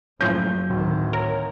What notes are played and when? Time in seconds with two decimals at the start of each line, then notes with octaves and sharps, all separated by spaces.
0.21 F#1 A2 F3 F#3 C#4 G6
0.70 D1 D#3
1.13 A#4 C#5